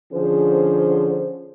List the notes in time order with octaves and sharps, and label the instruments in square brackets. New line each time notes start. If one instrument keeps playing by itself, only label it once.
[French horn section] D3 F3 C#4 G#4 C5